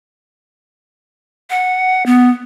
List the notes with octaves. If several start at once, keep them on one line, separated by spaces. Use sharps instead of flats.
F#5
B3